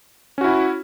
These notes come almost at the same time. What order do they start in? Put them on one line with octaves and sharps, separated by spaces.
C#4 F#4 E4